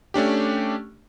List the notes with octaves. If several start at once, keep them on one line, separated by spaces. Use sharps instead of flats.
A3 C#4 D4 G4